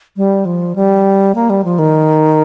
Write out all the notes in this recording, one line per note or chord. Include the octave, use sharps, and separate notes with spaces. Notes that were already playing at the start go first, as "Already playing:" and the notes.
G3
F3
G3
A#3
G3
F3
D#3